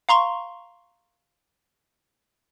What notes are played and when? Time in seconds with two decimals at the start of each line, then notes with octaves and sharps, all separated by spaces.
0.09 F5 A#5 C6 C#6